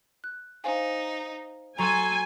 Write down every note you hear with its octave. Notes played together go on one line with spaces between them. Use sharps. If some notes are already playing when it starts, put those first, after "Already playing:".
F#6
D#4 C5 F5 G#5
F#3 A4 G#5 A#5 C6 C#6